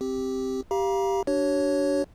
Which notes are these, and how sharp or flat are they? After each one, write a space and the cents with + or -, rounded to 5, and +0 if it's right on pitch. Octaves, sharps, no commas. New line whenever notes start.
C4 +0 G4 +0
G4 +0 F5 -5 A#5 +35
D4 -10 F#4 +45 C#5 +0